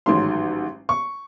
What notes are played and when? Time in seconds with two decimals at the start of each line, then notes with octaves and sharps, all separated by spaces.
0.06 A1 G#2 D#3 F#3 C6
0.89 C#6